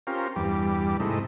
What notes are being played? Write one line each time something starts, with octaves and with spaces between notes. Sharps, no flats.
C4 C#4 F4 G4 A#4
E2 G2 G3 D6
G#2 C3 A3 D#4 E4